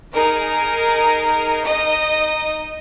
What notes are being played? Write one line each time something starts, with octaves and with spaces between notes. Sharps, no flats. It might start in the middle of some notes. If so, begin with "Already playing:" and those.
D#4 G#4 A#4
D#4 D#5